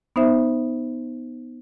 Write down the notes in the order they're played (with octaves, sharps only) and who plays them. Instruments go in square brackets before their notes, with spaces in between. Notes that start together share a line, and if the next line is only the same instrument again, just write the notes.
[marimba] B3 D#4 C5 E5